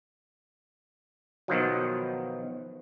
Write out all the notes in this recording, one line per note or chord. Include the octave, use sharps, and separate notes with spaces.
B2 D#3 F3 F#3